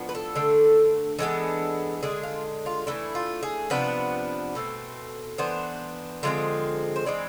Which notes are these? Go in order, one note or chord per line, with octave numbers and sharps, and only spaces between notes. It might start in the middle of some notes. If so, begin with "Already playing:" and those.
Already playing: A2 F3 B3 D4
B4
A4
D3 A3 D4
E3 G#3 B3 D4 A4
D3 G#3 D4 G#4
F4
F4
E3 A3 D4 E4
F4
G#4
C3 F3 B3 D4 B4
B2 A3 C4
E3 B3 D4 C5
D3 F3 G#3 C4
C5
E3 G#3 C4 D5